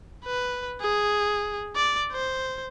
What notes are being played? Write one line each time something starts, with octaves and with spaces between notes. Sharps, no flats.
B4
G#4
D5
C5